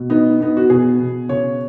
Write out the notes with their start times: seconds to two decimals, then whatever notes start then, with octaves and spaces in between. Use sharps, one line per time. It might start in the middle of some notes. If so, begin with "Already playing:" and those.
Already playing: B2
0.10 B3 D#4
0.40 B3 D#4
0.57 F#4
0.70 B2 G#4
0.99 B2
1.29 C#3 C#5